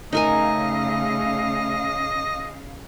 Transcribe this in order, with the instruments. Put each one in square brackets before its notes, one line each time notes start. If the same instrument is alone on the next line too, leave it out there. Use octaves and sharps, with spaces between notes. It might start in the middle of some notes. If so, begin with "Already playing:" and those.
[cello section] C#3 F5 [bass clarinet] A3 [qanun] D#4 A#4 G#5 [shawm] D#5